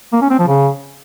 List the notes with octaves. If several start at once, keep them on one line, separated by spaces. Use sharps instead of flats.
A#3
C#4
C4
F3
C#3